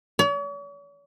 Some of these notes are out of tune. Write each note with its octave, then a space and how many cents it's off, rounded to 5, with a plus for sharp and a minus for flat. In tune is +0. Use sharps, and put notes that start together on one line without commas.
C#5 +45